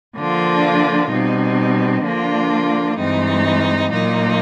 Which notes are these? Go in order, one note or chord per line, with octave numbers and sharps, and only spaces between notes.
D3 F3 A#3 D4 F4
B2 G3 C4 D#4
D3 F3 A#3 D4 F4
G2 E3 G#3 C4 D#4
A#2 F#3 A#3 D#4